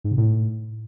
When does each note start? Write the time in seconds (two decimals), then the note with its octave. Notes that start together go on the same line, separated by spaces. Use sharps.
0.04 G#2
0.11 C3
0.18 A2